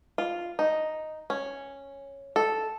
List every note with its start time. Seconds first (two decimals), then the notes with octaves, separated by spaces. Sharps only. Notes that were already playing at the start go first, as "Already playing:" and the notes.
0.18 F4
0.59 D#4
1.30 C#4
2.36 A4